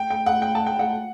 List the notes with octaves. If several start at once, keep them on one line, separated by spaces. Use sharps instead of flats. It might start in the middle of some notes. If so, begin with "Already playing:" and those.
Already playing: G5
G5
F#5
G5
A5
G5
F#5